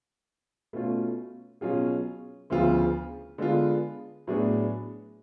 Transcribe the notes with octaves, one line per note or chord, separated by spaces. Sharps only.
B2 A3 C#4 F4
B2 F#3 C#4 F4 G#4
D2 C#3 F3 B3 F4
D3 G#3 B3 F4
A2 F#3 B3 D4 G#4